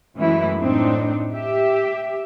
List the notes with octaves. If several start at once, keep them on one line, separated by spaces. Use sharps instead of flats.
F#2 E3 G#3 A3 E4
A2 C4 D4 D#4
G4 E5